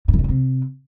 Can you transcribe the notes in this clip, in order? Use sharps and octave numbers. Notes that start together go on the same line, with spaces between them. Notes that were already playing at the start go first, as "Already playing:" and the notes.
G2
E3
D#3
D3
C3